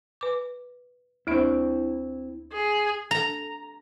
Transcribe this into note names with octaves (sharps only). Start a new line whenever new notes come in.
B4 D6
D2 C4 D4 E4 B5
G#4
A#5